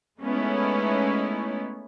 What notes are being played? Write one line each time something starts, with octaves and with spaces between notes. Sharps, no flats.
G#3 A3 B3 C#4 D#4 E4